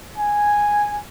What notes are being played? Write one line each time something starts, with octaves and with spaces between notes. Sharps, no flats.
G#5